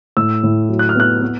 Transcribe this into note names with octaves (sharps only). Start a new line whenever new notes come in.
A2 E6
A2
F#3
F#6
F6
B3 F#6
B3